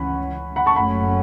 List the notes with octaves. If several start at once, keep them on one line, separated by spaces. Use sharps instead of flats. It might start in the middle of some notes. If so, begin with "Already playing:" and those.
Already playing: C#2 C#3 E3 C#4 F#5 B5
F#5 B5
A5 C#6
F#1 F#2 F#3 A3 C#4 F#5 B5